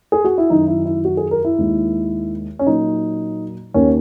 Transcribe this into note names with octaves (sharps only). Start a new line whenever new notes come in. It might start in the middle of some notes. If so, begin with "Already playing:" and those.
G#4
F#4
E4
F#2 D#3 F#3 D#4
E4
E4
F#4
G#4
A#4
E4
D#2 D#3 G#3
C#4
A#2 F#3 A#3 D#4
D#2 D#3 A#3 C#4